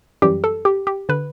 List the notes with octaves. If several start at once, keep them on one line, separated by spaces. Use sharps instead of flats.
F#2 E3 G3 G4
A4
G4
G4
D3 B4